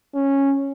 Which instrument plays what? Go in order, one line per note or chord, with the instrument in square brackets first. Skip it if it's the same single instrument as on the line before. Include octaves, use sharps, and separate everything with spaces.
[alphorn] C#4